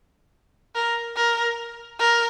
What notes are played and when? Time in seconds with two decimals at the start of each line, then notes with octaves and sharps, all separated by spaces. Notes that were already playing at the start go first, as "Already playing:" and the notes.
0.75 A#4
1.16 A#4
1.99 A#4